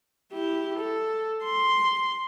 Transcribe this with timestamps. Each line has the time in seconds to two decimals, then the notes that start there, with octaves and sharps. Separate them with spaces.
0.33 E4 G4
0.79 A4
1.45 C6